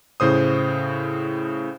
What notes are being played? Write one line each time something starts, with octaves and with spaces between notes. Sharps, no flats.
A2 C#3 C5 D#6